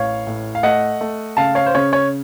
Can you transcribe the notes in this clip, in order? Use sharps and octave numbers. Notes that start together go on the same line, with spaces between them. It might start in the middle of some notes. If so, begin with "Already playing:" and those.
Already playing: A1 C#5 F5
A2
F5
A3 D#5 F#5
A3
C#3 F5 A5
C#5 F5
C5
C#3 C#5
C#5